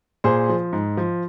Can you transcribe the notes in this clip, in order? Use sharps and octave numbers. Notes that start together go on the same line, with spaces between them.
A#2 G#4 C5
F3
G#2
F3